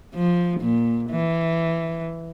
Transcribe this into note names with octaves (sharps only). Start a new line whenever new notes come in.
F3
A#2
E3